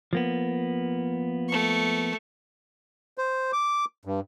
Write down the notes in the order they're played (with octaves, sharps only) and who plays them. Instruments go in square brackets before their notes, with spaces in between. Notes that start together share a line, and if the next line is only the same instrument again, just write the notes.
[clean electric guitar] F3 A#3 B3
[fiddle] A3 C#6
[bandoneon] C5
D6
G2